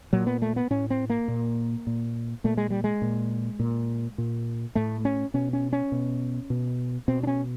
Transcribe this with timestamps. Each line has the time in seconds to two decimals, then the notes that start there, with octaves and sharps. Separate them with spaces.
0.13 A#2 F#3
0.27 B3
0.42 A3
0.56 B3
0.70 A2 C#4
0.90 C4
1.10 A#3
1.28 A#2
1.87 A#2
2.44 A#2 A3
2.57 G#3
2.70 G3
2.84 G#3
3.02 A#2
3.60 A#2
4.18 A#2
4.75 A2 A3
5.05 C#4
5.34 B2 C#4
5.53 C#4
5.73 C#4
5.92 B2
6.50 B2
7.08 B2 C4
7.23 D4
7.27 C#4